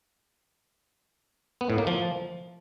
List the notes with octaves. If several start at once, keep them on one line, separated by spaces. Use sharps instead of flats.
B3
A2
A#3
F3